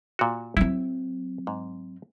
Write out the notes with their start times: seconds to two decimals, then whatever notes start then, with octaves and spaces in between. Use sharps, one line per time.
0.19 A#2 F#4
0.57 F#3 C4 E4
1.47 G#2